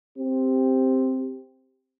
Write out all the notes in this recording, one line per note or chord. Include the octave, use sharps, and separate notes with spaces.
C4 G4